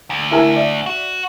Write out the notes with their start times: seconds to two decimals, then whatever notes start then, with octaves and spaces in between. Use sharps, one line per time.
0.10 D2
0.31 E4 A#4 G#5
0.56 D5 E5
0.86 F#4